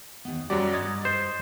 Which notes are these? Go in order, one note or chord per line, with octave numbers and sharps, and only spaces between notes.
D#2 B3
F#2 F#3 G3 D5 F#5
G2 D#5 G#6 A6
C5